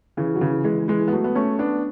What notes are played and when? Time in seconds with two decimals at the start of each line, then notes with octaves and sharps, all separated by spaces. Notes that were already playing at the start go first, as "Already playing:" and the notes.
0.17 C#3 E3
0.35 F#3
0.41 C#3 E3
0.64 E3 G#3
0.88 E3 G#3
1.08 B3
1.13 F#3 A3
1.24 B3
1.35 A3 C#4
1.59 B3 D4